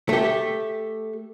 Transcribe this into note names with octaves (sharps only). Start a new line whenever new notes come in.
A3 G4